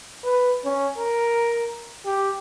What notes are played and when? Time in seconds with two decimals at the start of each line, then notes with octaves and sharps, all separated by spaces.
0.24 B4
0.64 C#4
0.98 A#4
2.06 G4